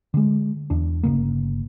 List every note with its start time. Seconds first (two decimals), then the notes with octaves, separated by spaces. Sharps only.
0.14 D3 G#3
0.70 E2 D4
1.03 G1 C#3 A#3